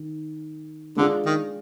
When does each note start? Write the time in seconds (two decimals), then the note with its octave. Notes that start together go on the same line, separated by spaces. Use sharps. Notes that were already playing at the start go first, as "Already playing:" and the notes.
Already playing: D#3
0.96 D3 G#3 D4 F4 G#4 D5
1.26 D#3